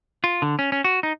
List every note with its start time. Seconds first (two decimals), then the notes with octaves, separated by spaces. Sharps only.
0.24 F4
0.42 D3
0.59 C#4
0.72 C#4
0.84 F#4
1.03 D#4